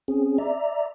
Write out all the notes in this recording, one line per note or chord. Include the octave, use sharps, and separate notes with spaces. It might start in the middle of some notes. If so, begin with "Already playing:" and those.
C4 C#4 G#4
D5 E5 A#5